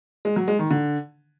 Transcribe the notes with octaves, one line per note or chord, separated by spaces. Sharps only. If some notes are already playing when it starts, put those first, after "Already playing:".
G#3
F#3
G#3
D#3
D3